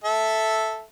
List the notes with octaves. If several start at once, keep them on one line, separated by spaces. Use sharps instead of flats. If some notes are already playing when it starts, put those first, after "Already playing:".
A4 E5